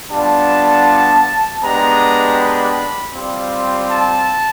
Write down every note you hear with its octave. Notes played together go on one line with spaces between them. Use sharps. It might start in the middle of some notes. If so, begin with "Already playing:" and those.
G3 B3 D4 F4 A5
G#3 B3 D4 G4 A#5
B5
G3 C4 F4
A5